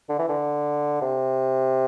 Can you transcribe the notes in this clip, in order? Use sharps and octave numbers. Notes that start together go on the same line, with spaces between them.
D3
E3
D3
C3